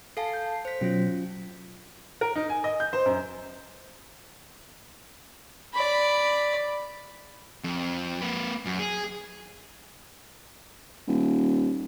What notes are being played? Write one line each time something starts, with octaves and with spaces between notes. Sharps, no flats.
A4 F5 G#5 A5 C7
G6
C5 B6
B2 F#3 C#4 F4
A#4
D#4
G#5
D#5
G6
C5
F#2
D5 B5
F2
A#3 B4
F#2
G#4
D#1